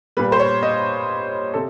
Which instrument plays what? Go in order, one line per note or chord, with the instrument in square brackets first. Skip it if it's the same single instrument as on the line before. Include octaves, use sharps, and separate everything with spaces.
[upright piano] A#2 G3 B4
C5
C#5
D#5
C3 A4